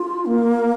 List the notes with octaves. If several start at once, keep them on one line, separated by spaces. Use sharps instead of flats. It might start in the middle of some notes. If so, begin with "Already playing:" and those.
Already playing: F4
A#3